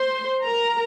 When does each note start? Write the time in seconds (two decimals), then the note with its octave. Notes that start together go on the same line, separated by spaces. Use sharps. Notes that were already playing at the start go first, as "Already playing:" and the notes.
Already playing: C5 C6
0.44 A#4 A#5